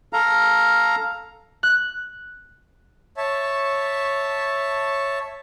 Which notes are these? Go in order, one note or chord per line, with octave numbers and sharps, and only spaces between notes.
A4 F5 A#5
F#6
C#5 E5 A5